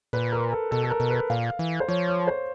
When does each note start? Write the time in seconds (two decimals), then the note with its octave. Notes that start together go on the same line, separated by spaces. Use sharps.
0.13 A#2 B4
0.32 A#4
0.52 A4
0.71 B2 A4
0.83 A4
0.91 A#4
1.00 B2
1.10 B4
1.30 A#2 F5
1.59 E3
1.80 C5
1.88 F3 C#5
2.07 C#5
2.27 C5